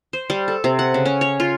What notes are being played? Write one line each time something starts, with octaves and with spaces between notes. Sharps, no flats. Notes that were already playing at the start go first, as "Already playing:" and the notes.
C5
G3
A4
C3
F#5
C#3
C#4
C#5
F4